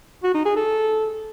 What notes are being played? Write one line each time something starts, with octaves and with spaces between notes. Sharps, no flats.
F#4
D#4
G#4
A4